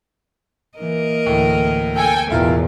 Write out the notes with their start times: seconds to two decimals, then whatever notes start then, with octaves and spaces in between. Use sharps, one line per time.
0.78 E3 A#3 A#4 D#5
1.26 D2 A2 E3
1.96 A4 G5 G#5
2.30 A1 E2 B2 E4 F4 A#4